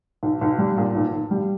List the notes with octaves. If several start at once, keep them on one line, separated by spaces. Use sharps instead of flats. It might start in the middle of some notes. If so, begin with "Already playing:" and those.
B1
B1
G3
A#2
B1
B1
G3